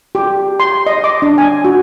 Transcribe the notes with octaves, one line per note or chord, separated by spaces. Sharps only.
G4
C6
D#5
D6
D4
G#5
F#4